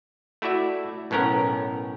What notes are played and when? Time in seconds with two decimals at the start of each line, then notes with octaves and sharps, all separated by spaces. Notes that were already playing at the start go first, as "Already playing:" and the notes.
0.42 A3 E4 F#4 D5 E5
1.11 B1 A2 B3 C#4 A#4